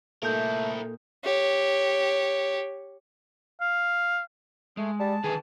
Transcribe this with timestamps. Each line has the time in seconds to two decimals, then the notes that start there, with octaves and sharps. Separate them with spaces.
0.23 A#2 A3 D#4 E4 A4 A#4 G6
1.24 G4 C#5
3.61 F5
4.77 G#3 A3
4.99 G3 A5
5.24 D3 D#3 G#4 B4